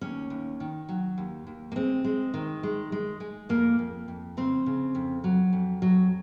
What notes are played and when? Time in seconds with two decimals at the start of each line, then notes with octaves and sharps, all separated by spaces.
0.01 D#2 C#4
0.30 D#2
0.60 D#3
0.89 F#3
1.18 D#2
1.47 D#2
1.72 A#3
1.76 G#3 C4
2.04 G#3
2.34 D#3
2.63 G#3
2.92 G#3
3.20 G#3
3.49 F2 A#3
3.79 F2
4.08 F2
4.37 C#3 C4
4.66 C#3
4.95 F2
5.24 F#3
5.53 F2
5.82 F#3